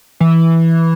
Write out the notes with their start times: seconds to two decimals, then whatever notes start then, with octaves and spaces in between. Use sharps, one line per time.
0.20 E3